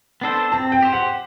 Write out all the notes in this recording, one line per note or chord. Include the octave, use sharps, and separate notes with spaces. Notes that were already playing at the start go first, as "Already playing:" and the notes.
B3 D4 A4 C5
C4 A5
G5
G4 C5
F#5